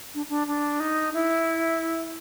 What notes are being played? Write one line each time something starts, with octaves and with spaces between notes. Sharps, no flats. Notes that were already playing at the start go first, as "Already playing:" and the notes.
D4
D4
D4
D#4
E4